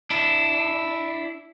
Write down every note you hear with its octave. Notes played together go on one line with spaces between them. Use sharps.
D4 E4